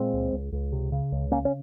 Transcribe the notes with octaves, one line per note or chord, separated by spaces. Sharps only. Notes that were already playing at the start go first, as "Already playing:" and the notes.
Already playing: A#2 G#3 C4
C#2
C#2
C#2
C3
C#3
C#2
C#3 A#3 C#4
C#4